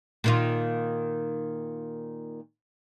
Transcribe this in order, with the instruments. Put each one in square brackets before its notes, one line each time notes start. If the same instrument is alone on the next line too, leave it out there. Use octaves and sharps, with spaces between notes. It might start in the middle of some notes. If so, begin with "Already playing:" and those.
[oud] A#2 D#3 F4